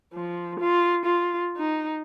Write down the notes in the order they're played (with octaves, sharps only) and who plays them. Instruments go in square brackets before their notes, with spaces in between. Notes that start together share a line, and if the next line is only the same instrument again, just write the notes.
[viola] F3
F4
F4
D#4